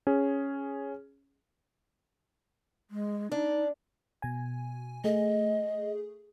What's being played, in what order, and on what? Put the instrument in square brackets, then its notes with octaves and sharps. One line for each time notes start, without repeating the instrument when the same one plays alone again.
[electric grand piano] C#4 G#4
[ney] G#3
[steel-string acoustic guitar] D4 [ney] D#4
[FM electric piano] B2 G#5
[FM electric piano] A3 G#4 [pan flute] D#5